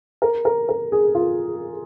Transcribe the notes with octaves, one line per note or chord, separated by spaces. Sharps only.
A#4
A#4
A#4
G#4
F4